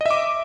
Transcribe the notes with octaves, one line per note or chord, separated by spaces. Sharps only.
D#5 E5 D6